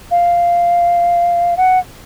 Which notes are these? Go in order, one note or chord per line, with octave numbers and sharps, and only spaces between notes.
F5
F#5